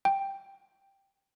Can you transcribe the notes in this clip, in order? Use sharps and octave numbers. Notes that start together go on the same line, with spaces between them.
G5